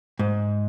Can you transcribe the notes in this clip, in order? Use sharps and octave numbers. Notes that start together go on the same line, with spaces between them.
G#2